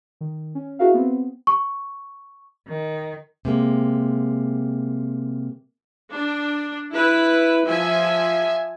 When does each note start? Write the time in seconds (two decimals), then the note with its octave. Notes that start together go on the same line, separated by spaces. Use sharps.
0.21 D#3
0.55 C#4
0.79 E4 F#4 G#4 A#4 E5 F5
0.94 B3 C4
1.47 C#6
2.68 D#3
3.45 C3 G#3 A#3
6.12 D4
6.92 E4 B4
7.66 F3 E5 G#5